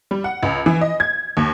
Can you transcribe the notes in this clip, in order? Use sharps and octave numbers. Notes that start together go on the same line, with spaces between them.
G3
F#5
C#2
E3
D#5
G#6
D#2